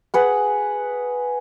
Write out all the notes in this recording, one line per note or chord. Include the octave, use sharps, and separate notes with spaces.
G#4 B4 F#5